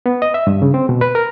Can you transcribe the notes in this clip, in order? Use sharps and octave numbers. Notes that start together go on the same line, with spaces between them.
B3
D#5
E5
G2
C#3
C4
B2
B4
A#4